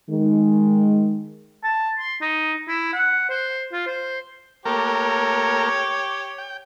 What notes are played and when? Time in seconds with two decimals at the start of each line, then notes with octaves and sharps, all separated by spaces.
0.10 D#3 G#3
1.64 A5
1.99 C6
2.21 D#4
2.69 E4
2.93 F#5
3.30 C5
3.72 F4
3.87 C5
4.65 A3 A#3 G4 A#4 C#5
6.38 G5